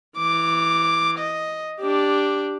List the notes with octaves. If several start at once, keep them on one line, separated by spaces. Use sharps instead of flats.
E3 D6
D#5
D4 G4